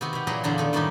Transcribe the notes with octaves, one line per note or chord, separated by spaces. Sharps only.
C3 D#3 B3 F#4
B2 G4
A#2 E3 F#3 G#4 B4 A#5
E2 A#2 D3 D4 F4 A#5
D#3 A3 B3
F#2 A2 D#3 G3 D4 D#4